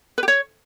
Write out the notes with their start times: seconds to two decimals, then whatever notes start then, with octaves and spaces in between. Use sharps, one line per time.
0.18 B4
0.23 G4
0.28 C#5